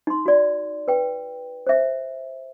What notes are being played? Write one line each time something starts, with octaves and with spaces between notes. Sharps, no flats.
D#4 C6
F#4 D5
B4 G5
C5 E5